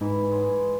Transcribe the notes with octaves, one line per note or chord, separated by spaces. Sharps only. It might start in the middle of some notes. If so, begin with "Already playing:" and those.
G#2 E3
G#3